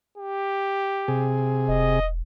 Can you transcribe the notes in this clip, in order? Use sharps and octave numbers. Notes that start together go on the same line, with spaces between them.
G4
C3 G#4
E1 D#5